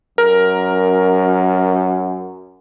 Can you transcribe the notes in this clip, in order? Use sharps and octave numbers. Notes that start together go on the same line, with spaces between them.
F#2 A#4